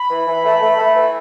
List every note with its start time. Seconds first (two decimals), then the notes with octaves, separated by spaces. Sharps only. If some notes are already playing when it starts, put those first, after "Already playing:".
Already playing: B5
0.09 E3
0.26 E3
0.44 A3
0.61 A3
0.78 A3
0.95 E3